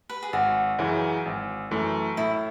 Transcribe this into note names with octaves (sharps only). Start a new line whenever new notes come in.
B4
G#4
G#1 F#4
F#2 C#3 E3
G#1
F#2 E3 A3
A2 E4